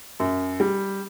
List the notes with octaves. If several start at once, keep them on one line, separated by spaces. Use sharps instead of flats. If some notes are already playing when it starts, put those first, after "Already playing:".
F#2
G3